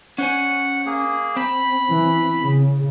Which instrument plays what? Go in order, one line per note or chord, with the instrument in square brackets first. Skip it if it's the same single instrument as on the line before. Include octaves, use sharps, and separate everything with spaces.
[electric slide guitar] C#4 C5 G#5 [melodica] F#5
[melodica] A#3 G#4
[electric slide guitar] C4 [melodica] B5
[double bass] E3
C#3